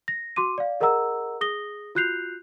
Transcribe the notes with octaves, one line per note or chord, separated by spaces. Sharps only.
A#6
F#4 C6 D6 D#7
D5 F5
G#4 A#4 D#5 F#5 A#5 E6
G#4 D#6 A#6 G7
F4 F#4 F#6 G6 C7 F7